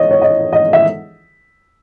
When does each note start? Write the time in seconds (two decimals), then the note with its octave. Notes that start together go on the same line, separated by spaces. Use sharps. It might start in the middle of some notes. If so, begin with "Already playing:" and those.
Already playing: C#5 D#5
0.11 C#5
0.22 D#5
0.53 D#5
0.73 E5